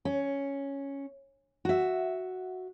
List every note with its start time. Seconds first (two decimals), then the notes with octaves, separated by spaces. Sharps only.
0.05 C#4
1.65 F#4 E5